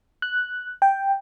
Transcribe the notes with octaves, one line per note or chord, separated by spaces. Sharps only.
F#6
G5